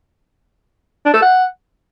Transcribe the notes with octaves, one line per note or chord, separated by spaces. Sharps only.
D4
A4
F#5